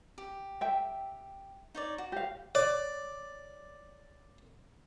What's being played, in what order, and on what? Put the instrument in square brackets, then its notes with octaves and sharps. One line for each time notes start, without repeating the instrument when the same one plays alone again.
[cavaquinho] G4
[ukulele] E5 G5
[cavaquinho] D#4 C#5 D5
F#4
[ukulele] G4 F5
[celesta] C#5 [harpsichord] D5